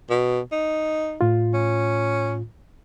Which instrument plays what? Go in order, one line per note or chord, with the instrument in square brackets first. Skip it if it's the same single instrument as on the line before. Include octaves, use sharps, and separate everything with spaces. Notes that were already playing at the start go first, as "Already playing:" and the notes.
[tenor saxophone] B2
D#4
[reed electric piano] A2 F4
[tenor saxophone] C#4